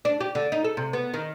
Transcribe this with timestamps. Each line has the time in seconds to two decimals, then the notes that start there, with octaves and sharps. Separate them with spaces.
0.05 D4
0.20 G4
0.35 D3
0.52 D#4
0.64 A4
0.77 C3
0.93 B3
1.14 D#3